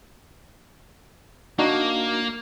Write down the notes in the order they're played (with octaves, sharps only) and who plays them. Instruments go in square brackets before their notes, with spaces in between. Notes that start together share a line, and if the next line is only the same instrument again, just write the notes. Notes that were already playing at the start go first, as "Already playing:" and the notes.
[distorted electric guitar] A#3 [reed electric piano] D4 D#4 F#4